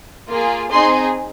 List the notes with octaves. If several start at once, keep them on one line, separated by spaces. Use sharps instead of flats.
A#3 F4 G#4
C4 D#4 G#4 C6